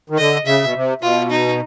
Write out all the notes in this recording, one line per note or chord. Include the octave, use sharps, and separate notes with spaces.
D#3
D3 D#5
C#3 E5
B2
C3
B2 F4
D#4